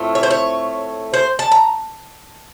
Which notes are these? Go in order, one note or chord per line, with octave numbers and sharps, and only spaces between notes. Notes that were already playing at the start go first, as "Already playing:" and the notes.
Already playing: A2 A3 C4 F4
C#5
C5
C#5
C5
A5
A#5